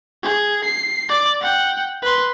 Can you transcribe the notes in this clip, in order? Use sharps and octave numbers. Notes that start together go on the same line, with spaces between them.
G#4
C7
D5 D6
F#5 G5
B4 C6